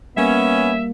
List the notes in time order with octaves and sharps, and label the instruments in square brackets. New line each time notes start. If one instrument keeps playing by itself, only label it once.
[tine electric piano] G3 A#3 [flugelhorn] B3 [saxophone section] C#4 [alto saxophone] E5